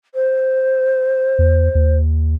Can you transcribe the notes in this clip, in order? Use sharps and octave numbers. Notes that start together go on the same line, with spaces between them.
C5
E2
D#2